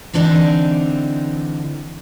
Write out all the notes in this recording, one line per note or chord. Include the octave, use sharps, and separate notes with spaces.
D3 E3 C4 D4 D#4